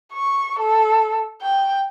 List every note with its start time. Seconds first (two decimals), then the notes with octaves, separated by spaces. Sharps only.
0.13 C#6
0.59 A4
1.41 G5